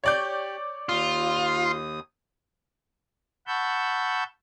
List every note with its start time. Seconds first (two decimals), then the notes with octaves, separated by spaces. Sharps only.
0.04 G4 C#5 D5 G6
0.89 D#2 F4 D#6
3.47 F#5 A5 B5 C#6 E6 G6